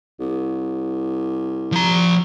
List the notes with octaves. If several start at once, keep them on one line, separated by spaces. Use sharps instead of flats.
C2
F3 A#5